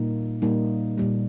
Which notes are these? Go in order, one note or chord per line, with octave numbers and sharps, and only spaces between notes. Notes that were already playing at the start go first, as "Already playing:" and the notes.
Already playing: A#2 G3 A#3 D#4
A#2 G3 A#3 D#4
A#2 G3 A#3